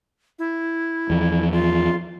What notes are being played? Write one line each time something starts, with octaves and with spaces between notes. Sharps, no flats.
E4
E2 F3
F4